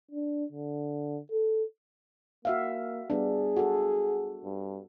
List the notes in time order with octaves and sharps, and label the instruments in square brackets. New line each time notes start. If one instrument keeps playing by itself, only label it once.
[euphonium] D4
D3
A4
[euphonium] A#3 [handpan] F#4 E5 F5
[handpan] G3 B3 D4 [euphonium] G#4
[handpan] F#4 A4
[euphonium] G2